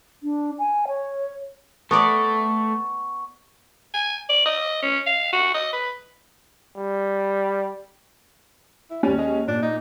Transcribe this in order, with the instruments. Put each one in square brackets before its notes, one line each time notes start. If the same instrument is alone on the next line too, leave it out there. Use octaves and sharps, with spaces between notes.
[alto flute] D4
G#5
C#5
[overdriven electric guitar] A3 A4 [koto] B3 A#4 D5 [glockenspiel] C#6
[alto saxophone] G#5
D5
D#5
C#4
F5
F#4
D#5
B4
[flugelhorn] G3
[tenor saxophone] E4
[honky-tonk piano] D#2 C#4 [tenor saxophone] G3
[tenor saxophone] G#3
[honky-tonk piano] A#2 [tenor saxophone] D4
[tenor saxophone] D#4